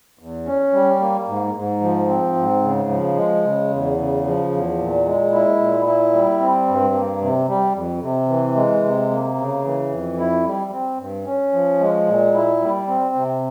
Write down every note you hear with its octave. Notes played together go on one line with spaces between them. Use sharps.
E2
C#4
G3
A#3
G#2
G#2
F3
C4
G#2
C#3
F3
G#3
C#3
E2
C#3
F3
E2
A#2
G#3
E4
A#2
E4
G3
C4
G2
A#3
C3
G3
F2
C3
E3
G#3
C3
A#3
C#3
E3
F2
E4
G3
C4
G2
C#4
F3
G#3
A#2
E4
G3
C4
C3